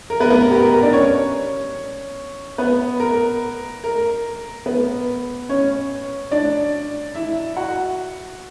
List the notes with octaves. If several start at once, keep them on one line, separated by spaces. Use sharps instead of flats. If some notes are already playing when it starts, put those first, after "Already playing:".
A#4
B3 B4
B3 B4
A#4
G4
A#4
A#4
D4 D5
C#4 C#5
B3 B4
A#4
A#4
B3 B4
C#4 C#5
D4 D5
E4 E5
F#4 F#5